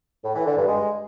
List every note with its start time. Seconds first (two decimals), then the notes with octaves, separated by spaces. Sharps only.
0.24 A2
0.35 E3
0.46 D3
0.57 G2
0.68 G#3